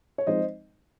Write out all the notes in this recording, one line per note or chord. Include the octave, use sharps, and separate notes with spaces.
C#5
F3 G#3 C4 D#4 C5 D#5